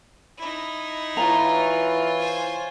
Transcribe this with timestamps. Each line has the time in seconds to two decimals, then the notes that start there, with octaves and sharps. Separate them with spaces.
0.38 D#4 E4
1.17 E3 F4 C#5 A#5
2.17 C5 G#5